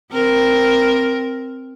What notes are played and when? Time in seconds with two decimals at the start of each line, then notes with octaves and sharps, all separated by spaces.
0.12 C4 A#4